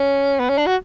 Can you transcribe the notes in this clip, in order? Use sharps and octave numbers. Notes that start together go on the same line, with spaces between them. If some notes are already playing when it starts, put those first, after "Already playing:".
Already playing: C#4
B3
C#4
D4
F#4